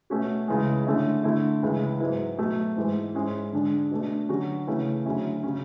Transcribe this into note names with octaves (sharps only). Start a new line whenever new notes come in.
B2 A3 C#4 F#4
C#2 C#3 E3 G#3
D3 A3 C#4 E4
D3 A3 E4
C#2 C#3 E3 G#3
G#2 F#3 B3 E4
B2 F#3 A3
G#2 E3 G#3 B3
G#2 G#3 C#4 E4
D3 G#3 D4
B2 A3 D4
D3 F#3 C#4 F#4
C#3 E3 A3 C#4 E4
D2 D3 F#3 C#4 E4
C#3 F#3 C#4